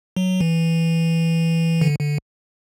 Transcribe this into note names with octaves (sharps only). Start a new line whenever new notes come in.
F#3
E3
D3
D3